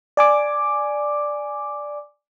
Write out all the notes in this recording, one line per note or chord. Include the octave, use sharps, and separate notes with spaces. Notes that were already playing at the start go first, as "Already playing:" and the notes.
D5 G#5 D6